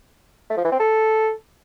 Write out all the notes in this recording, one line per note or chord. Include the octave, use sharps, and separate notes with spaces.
A3
F3
E3
C4
A4